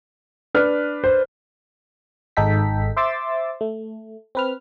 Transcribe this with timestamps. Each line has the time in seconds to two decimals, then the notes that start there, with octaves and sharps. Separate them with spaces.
0.55 D4 B4 F6
1.04 C5
2.37 G#1 G#3 D#4 A4 G5 B6
2.96 C5 E5 C6 D6 E6 A6
3.61 A3
4.35 C4 B4 F6